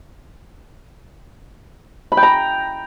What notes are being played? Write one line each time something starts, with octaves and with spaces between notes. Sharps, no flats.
B5
G5
A#5